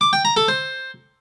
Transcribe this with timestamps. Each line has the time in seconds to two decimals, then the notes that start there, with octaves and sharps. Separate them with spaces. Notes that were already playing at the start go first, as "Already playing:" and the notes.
0.01 D6
0.13 G5
0.25 A#5
0.37 A4
0.48 C5